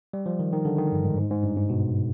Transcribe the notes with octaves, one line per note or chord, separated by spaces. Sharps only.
G3
F3
D#3
D#3
D3
D#3
G2
G#2
G#2
G#2
G2
G#2
B2